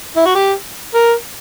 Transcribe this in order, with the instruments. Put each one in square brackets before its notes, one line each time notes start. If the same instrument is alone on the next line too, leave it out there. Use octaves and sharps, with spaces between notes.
[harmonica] E4
F#4
G4
A#4